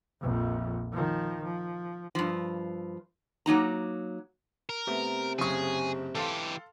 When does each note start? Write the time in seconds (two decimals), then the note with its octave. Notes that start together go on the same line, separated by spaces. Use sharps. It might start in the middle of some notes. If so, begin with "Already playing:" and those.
0.21 A#1 F2
0.92 D#3 F3
1.44 F3
2.15 G2 F3
3.46 F#3 A#3 D#4 A#5
4.69 A#4
4.87 C3 A3 B3
5.39 F#1 C#3 G#4 C#6
6.15 E3 G4 A4 F5 C6